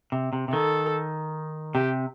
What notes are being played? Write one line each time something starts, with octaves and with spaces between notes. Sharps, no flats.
C3
C3
C3
D#3 A4
C3 G4